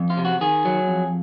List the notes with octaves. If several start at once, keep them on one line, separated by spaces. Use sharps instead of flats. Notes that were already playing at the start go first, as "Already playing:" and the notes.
Already playing: F2
F4
C3
F#4
D#3 G#4
F#3
F2